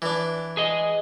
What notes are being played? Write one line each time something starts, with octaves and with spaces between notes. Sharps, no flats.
E3 D4
G#4 D#5